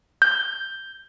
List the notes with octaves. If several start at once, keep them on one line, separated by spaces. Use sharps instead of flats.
G6